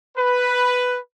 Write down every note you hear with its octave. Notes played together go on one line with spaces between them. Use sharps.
B4